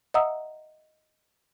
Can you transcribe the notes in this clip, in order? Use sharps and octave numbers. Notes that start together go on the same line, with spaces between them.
D#5 E5 F#5 A#5 D#6 E6